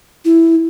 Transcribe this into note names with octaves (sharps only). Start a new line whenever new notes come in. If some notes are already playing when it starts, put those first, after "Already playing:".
E4